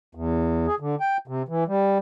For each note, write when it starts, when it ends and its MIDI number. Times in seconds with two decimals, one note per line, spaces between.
0.15 0.67 40
0.67 0.75 68
0.80 0.95 50
1.00 1.17 79
1.28 1.43 48
1.48 1.64 52
1.68 1.98 55